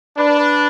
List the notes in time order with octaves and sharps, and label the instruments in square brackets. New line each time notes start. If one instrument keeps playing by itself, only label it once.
[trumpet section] D4 [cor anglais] B4
[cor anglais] B4
B4